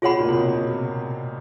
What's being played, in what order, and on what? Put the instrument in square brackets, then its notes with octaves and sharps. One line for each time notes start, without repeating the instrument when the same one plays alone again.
[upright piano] B2 [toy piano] F4 G#4 C#5 F#5 B5
[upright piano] A#2
C3
B2
B2